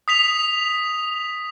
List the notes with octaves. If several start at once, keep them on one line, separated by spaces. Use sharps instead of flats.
D#6 B6 F7